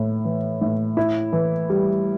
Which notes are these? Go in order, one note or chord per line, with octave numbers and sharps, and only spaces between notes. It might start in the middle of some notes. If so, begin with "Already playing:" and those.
Already playing: A2
E3
A2
E4
E3
G3